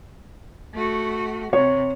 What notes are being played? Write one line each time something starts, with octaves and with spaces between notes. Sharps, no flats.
A3 F#4
C3 C#5